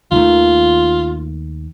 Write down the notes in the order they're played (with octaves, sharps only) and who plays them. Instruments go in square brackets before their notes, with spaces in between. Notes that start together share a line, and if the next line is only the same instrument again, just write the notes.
[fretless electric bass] D#2 D#3 A3 [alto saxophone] F4